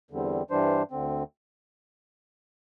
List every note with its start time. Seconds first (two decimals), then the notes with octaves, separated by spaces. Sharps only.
0.11 E2 D3 G3 C4
0.50 G2 E3 G3 D4 C5
0.91 D2 D3 C4